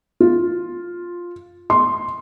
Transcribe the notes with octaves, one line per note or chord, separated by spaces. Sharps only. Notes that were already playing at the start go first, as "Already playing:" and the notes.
F4
C6